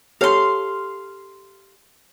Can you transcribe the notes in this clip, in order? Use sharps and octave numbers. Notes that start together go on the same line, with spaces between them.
G4 A4 C#5 F5 C6